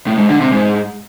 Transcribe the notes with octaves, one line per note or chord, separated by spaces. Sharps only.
A2
G#2
D3
C3
G#2